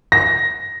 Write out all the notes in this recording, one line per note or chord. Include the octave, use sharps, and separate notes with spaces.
A#6